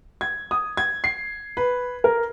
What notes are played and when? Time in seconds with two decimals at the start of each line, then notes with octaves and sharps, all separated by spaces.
0.21 G#6
0.51 D#6
0.77 G#6
1.04 C7
1.57 B4
2.04 A#4